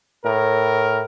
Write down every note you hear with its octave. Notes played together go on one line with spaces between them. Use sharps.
A2 A#4